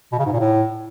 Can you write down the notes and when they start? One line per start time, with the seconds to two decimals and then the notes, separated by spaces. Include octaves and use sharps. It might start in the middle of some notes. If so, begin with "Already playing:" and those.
0.12 B2
0.19 C#3
0.26 G#2
0.33 A#2
0.39 A2